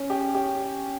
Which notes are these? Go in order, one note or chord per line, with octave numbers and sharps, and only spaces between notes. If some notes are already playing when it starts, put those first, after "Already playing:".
Already playing: C#4
G4
G4